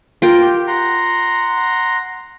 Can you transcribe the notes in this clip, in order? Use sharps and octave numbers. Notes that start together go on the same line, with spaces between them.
F4 A#4 G5
G4
F#5 A#5 C6